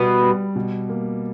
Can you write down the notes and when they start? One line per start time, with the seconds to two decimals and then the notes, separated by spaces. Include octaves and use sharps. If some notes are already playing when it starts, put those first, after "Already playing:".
Already playing: B2 G3 B3
0.23 G3
0.55 B2
0.89 A#3